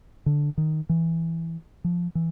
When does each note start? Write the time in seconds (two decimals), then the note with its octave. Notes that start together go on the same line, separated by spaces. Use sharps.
0.26 D3
0.58 D#3
0.89 E3
1.84 F3
2.15 E3